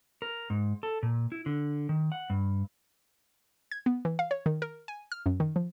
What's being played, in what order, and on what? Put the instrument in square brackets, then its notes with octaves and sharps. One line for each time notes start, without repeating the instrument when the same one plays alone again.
[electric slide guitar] A#4
G#2
A4
A#2
E4
D3
D#3
F#5
G2
[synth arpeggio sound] G#6
B3
E3
F5
C#5
D#3
A#4
G#5
F6
F#2
D#3
F3